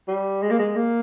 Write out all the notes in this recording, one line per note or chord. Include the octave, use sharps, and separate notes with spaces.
G3
G#3
A#3
G#3
A#3